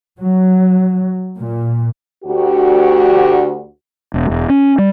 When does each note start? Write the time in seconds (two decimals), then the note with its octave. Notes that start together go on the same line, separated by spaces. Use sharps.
0.18 F#3
1.37 A#2
2.25 D2 F#4 G4
4.14 E1
4.30 E1
4.49 C#4
4.78 G3